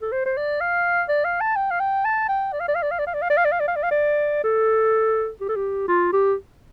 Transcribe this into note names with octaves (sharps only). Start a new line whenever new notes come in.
A4
C5
C5
D5
F5
D5
F5
A5
G5
F5
G5
A5
G5
D5
F5
D5
F5
D5
F5
D5
F5
D5
F5
D5
F5
D5
F5
D5
F5
D5
F5
D5
A4
G4
A4
G4
F4
G4